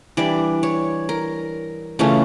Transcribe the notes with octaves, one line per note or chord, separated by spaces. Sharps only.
E3 G3 D4 D5
C#5
A#4
C#3 E3 A3 C#4 F4